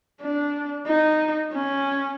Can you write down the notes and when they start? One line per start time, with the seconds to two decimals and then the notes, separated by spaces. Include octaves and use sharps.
0.21 D4
0.86 D#4
1.52 C#4